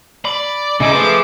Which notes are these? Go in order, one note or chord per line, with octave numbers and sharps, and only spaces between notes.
D5 B5
C#3 G#3 D#4 E4 G#4 A4 D6
F3 A3 G#4 B4 E5